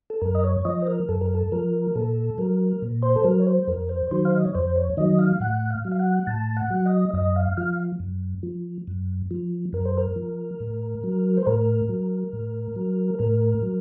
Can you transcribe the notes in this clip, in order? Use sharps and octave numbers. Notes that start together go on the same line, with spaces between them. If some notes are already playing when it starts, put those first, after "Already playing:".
A4
F#2 A#4
D#5
C#5
F3 D#5
C5
A#4
F#2 A4
A#4
A4
F3 A#4
A#2 A4
F#3 A#4
A#2
C5
A4
F#3 A#4
C#5
C5
F2 A#4
C5
D#3 F#3 C5
F5
D#5
C#5
F2 C5
C#5
D#3 F#3 D#5
F5
A2 F#5
F5
F#3
F5
F#5
A2 A5
F#5
F#3
D#5
F#2 D#5
F5
F3 F5
F#2
F3
F#2
F3
F#2 A#4
C5
A#4
F3
A2
F#3
C5
A2 A#4
F#3
A2
F#3
A2 A#4
F#3